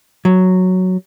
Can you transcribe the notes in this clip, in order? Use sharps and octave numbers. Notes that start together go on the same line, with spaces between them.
F#3